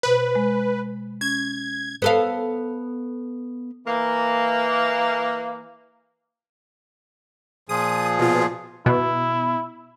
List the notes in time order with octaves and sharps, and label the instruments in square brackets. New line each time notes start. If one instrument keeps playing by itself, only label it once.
[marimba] B2 C5 [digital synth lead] B4
[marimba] G#3
[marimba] C#4 [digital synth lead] G#6
[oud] B3 A4 F5
[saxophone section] E3 A#3
[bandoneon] A#2 F3 G#4 [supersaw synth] D#6
[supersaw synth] B2 F4
[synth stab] B2 [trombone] E4